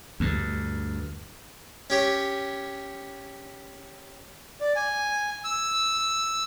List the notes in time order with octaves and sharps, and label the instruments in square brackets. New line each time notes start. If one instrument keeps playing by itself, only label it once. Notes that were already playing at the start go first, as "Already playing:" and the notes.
[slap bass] D2 G2
[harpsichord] C#4 G4 C#5
[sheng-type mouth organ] D5
G#5
E6